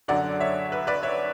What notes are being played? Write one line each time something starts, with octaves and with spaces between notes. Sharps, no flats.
F#2 D3 F#3 D5 F#5
C#5 E5
B4
B4 D5
C#5 E5